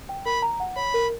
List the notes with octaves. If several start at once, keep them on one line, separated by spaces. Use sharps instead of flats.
G5
A#4 B5
A#5
F#5
C#5 B5
A#4